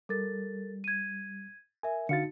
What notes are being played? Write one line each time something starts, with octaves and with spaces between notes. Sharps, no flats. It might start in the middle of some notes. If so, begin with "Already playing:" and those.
G3 A4 A#4 A6
G#6 D#7
A#4 E5 G#5
D3 D#4 F#4 F5 A6 C#7